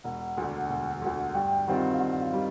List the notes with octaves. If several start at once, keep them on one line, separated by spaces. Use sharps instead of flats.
E1 F#5
D2 D3
E1
D2 D3
G2 G5
D#3 G3 C4 F4 F#5
F5
G2 F#5
F#5
F5
D#3 G3 C4